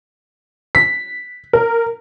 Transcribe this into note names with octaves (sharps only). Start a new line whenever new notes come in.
B6
A#4